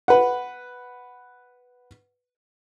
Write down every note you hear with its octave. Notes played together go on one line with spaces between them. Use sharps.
B4 F#5